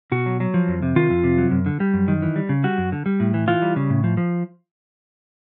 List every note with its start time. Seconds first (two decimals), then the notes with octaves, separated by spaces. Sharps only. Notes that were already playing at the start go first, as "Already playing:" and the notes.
0.12 B2 F#4
0.26 F#3
0.40 F#3
0.54 F3
0.68 F2
0.82 C3
0.96 D#3 F4
1.10 F2
1.24 C3
1.38 F#3
1.51 F#2
1.66 D3
1.80 G3
1.94 F#2
2.08 D#3
2.22 E3
2.36 G3
2.49 C#3
2.64 G3 F#4
2.78 F#2
2.92 D3
3.06 G3
3.20 A2
3.34 E3
3.48 E3 F4
3.62 G3
3.76 C#3
3.90 A2
4.04 F3
4.17 F3